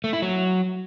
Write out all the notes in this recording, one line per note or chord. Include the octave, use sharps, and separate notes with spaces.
A3
E4
F#3